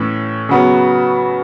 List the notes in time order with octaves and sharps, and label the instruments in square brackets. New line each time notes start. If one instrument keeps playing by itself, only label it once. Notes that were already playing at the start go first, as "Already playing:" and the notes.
Already playing: [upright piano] A2 E3 C#4
C#3 F#3 B3